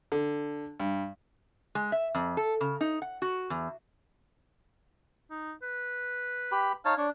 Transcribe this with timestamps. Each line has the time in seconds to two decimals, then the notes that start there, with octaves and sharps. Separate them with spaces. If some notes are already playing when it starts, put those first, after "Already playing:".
0.12 D3
0.80 G2
1.75 G#3
1.92 E5
2.15 F2
2.37 A4
2.61 C#3
2.81 D#4
3.02 F#5
3.22 F#4
3.50 E2
5.31 D#4
5.63 B4
6.52 G4 B5
6.85 D#4 C#5 F5 A5
6.98 D4 C#5